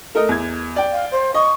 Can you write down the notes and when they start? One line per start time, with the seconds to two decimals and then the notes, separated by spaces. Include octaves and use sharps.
0.15 A3 A#4 D#5
0.29 E2 G#6
0.76 D5 G5
0.92 F5
1.11 C5
1.34 D#5 C#6